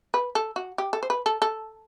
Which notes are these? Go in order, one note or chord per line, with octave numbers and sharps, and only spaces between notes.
B4
A4
F#4
G4
A4
C5
B4
A4
A4